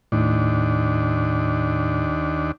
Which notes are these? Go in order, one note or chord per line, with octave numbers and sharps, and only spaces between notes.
D#2 A2 D4